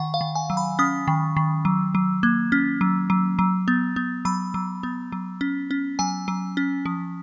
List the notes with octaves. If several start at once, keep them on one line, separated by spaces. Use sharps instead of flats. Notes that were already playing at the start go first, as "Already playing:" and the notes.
Already playing: D#3 F#5
F5
D#3
G#5
F#3
B5
C#4 D#6
D#3
D#3
F#3
F#3
A#3
C#4
F#3
F#3
F#3
B3
B3
F#3 B5
F#3
B3
F#3
C#4
C#4
F#3 G#5
F#3
C#4
F3